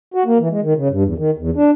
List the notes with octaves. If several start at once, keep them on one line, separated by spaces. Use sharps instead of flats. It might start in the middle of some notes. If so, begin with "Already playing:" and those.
F#4
A#3
E3
G#3
D#3
C#3
G2
E2
D#3
E2
D4